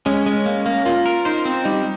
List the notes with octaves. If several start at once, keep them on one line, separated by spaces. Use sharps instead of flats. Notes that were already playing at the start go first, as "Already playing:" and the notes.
G#3 C#4
G#3
A#3
A#3
A#3 F4
A#4
D#4 C5
C4
G3 D#4